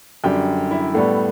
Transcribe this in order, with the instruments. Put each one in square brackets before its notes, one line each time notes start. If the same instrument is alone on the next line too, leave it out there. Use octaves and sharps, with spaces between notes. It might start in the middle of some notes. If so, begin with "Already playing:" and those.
[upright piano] F#2 D3 G3 G4 G5
E4 E5
A2 G3 B3 A4